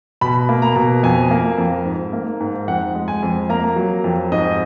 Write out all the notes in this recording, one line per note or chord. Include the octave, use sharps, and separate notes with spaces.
B2 B5
A#3
A#5
B2
F2 G#5
A#3
F2
G#2
A#3
G#2
F2 F#5
G#3
G#5
F2
A#3 A#5
F#3
F2
G#2 D#5